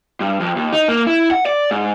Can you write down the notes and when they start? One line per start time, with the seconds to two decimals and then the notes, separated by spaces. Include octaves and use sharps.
0.20 G2
0.40 F2
0.56 D#2
0.73 D#4
0.88 A#3
1.07 E4
1.31 F#5
1.46 D5
1.71 G#2